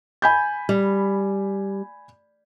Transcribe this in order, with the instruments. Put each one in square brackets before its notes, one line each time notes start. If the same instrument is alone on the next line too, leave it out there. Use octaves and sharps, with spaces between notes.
[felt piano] G#5 B5 G6
[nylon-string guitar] G3